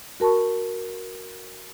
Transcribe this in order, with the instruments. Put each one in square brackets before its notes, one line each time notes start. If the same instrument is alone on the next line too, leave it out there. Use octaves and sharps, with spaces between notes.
[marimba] F#4 A#4 A5 B5 C#6